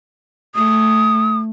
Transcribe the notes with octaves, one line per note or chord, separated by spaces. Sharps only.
A3 D#6